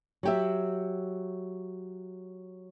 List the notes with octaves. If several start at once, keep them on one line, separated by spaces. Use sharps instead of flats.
F#3 G4 E5